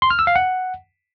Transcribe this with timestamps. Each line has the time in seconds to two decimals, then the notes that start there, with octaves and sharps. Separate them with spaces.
0.02 C6
0.10 F6
0.19 E6
0.27 F5
0.36 F#5